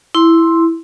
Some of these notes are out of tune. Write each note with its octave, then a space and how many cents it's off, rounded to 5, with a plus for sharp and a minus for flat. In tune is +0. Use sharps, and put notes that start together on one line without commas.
E4 +0 C6 +5